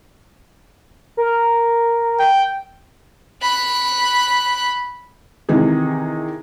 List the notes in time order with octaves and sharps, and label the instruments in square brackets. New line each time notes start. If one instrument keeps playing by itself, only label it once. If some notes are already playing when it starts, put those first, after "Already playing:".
[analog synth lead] A#4
[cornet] G5
[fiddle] B5 F#6
[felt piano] C3 D#3 E3 D#4 G#4